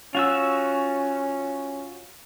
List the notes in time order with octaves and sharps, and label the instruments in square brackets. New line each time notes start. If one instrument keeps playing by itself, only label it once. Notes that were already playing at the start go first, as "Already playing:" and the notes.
[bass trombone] C#4 [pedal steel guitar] F4 F#4 E6